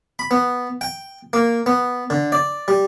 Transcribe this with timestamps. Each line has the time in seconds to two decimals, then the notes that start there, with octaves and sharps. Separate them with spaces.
0.19 B5
0.31 B3
0.81 G5
1.33 A#3
1.66 B3
2.10 D3
2.32 D5
2.68 G3